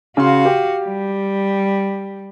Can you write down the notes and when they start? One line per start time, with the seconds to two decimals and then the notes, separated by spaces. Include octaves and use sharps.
0.17 C#3 F#4 F5 C6
0.45 G4
0.85 G3